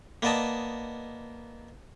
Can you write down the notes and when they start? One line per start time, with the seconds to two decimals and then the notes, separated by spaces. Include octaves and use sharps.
0.22 A#3 B3 D5 D#5 A5